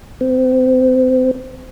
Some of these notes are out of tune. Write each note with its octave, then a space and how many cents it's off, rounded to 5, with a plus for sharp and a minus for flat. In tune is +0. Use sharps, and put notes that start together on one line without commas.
C4 -30